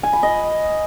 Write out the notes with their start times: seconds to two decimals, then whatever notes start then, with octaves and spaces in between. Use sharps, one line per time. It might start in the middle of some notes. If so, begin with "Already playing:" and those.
0.03 G#5
0.13 B5
0.23 D#5